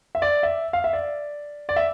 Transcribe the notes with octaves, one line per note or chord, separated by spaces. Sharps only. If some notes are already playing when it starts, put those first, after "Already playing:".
E5
D5
E5
F5
E5
D5
D5
E5